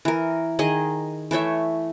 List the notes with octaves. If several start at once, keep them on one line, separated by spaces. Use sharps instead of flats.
E3 A#4
D#3 G#4 D#5
E3 A3 C#5 E5